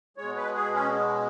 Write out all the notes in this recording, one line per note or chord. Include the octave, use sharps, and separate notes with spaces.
B2 G#3 C#5
B4
G#4
C#4